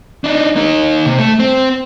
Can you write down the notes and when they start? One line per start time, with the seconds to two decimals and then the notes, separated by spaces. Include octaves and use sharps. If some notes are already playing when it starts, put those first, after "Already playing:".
0.24 D4 D#4
0.56 A#3 D#4
1.06 C3
1.19 A3
1.40 C4